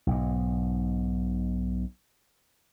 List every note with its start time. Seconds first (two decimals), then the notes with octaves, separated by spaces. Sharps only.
0.07 B1 G#2